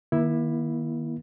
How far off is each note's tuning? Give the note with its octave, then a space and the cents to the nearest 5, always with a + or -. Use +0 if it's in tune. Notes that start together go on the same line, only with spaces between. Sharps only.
D#3 +0 A#3 +35 E4 +0